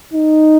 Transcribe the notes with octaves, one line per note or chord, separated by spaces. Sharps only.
D#4